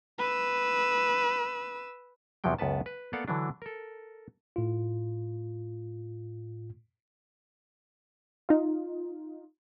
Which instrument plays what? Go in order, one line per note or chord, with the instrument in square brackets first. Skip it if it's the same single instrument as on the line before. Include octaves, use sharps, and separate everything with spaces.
[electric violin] B4 E6
[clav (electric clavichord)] E2 C3 F3 F#3 G5
C#2 F#2 B3 B4 A5
B4
A#3 B3 A4 D5 F5 F#5
D3 E3 F#3 D4
A4 A#4
[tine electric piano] A2 F4
[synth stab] D#4 F4